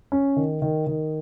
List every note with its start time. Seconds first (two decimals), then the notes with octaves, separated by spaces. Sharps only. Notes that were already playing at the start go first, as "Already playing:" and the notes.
0.12 C#4
0.36 D#3
0.62 D#3
0.87 D#3